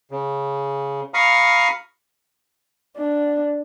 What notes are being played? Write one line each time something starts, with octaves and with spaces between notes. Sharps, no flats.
C#3
F5 A#5 B5 C#6 D#6 F6
D4